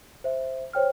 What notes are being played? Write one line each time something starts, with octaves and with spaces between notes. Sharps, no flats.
C5 E5
C5 C#5 G5 F6